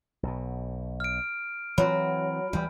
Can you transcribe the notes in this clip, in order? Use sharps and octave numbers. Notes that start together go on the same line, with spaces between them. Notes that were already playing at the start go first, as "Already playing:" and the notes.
B1 B2
F6 D7
E3 F#3 C4 B5
D2 E3 G3